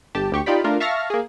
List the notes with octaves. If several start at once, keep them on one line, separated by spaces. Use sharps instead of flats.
G1 G4 A5
D2 G4 C#6
D#4 F4 G4 D5 B5
A3 D4 F4 A#4
E5 F5 A5 C#6 F6 A#6
A#3 G#4